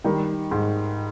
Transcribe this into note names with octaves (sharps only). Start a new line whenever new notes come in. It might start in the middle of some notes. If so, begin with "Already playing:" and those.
D#3 G3
G#2